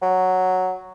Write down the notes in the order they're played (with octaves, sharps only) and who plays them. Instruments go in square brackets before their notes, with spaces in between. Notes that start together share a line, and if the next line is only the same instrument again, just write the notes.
[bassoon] F#3